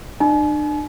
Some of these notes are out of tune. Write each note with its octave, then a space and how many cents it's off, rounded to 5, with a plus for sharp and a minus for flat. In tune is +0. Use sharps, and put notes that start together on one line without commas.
D4 +40 G#5 +40